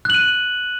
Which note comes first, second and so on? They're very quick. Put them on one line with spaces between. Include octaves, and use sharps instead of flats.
F#6 F#7 D#7